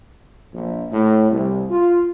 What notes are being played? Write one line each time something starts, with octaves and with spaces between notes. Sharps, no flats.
A#1
A2
C2
F4